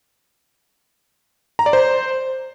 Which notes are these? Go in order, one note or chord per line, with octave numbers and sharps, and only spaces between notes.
A#5
D5
C5